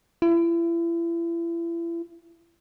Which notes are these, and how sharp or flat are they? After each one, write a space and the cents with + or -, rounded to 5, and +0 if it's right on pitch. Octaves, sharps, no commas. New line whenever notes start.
E4 +35